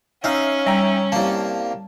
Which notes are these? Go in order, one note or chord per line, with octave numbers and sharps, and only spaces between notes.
C#4 D#4 E5 F5
G3 E5 G5 A#5
C2 A#3 A5